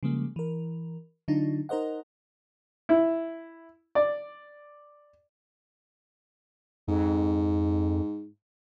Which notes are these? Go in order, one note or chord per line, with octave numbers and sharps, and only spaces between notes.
C#3 F3 G3 G#3 A#3
E3 A#4
D3 F#3 D4 D#4 F4
D#4 A#4 C5 D#5 F#5
E4
D5
F2 G#2